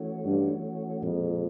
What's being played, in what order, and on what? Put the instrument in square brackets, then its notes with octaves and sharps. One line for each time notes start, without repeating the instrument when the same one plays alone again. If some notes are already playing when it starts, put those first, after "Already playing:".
Already playing: [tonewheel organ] E3 A3 C#4 F#4
[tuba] G2
[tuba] F2 [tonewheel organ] A#2 F3 G#3